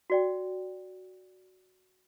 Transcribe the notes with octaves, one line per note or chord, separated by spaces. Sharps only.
F#4 D5 G5